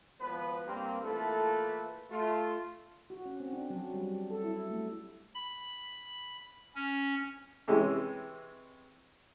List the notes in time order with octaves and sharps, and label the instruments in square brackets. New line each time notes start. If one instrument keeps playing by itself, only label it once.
[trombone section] G#1 F3 B3 B4
G2 A#3 C4
E3 A3 A#3 F4 A4 B4
A3 F4
[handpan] F#4
C#4
C4
D4
F#3
G3
A4
E4
A3
[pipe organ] B5
C#4
[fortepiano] C3 E3 G#3 C#4